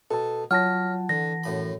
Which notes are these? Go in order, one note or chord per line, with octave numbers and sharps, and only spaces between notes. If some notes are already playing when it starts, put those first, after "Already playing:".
B2 A4 A5
F#3 F4 C#5 F#5 A5 F6 A#6
D3 E3 A#6
F#2 A2 B5